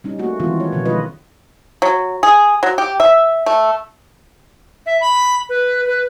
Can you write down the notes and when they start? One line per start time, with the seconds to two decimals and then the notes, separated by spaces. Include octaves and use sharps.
0.04 G3 C#4 D#4
0.19 A3 A#3 F#4
0.40 D#3 E3 G#3 B3 C4 F4
0.60 C#5
0.73 B2 D3 D#3 F3
0.85 D#3 G#3 F4 B4 D#5
1.82 F#3
2.23 G#4
2.63 F#3
2.78 G4
3.00 E5
3.46 A3
4.86 E5
5.01 B5
5.49 B4
5.86 B4